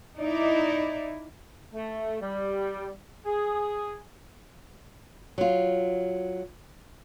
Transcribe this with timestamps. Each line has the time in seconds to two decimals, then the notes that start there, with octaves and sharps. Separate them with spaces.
0.17 D#4 E4 D5
1.74 A3
2.21 G3
3.25 G#4
5.38 F#3 F4